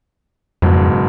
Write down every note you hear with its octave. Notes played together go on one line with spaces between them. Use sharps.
F#1 F2 G#2 B2